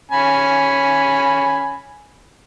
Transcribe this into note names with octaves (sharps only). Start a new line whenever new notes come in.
C#4 G#5 B5